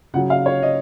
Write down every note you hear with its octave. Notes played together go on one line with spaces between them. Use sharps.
C#3 F#3 F#5
F5
C#5
D#5